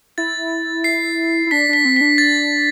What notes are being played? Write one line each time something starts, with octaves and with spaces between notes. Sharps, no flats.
E4 A6
C7
E4
D4 B6
D4 B6
C4
D4 B6
A6